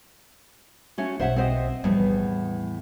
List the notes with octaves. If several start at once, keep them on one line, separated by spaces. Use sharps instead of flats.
A3 C#4 F#4
B1 C5 E5 F#5
C4 C5 D#5
E2 A2 F3 G3 B3